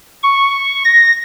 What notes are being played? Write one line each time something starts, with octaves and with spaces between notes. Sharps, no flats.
C#6
A#6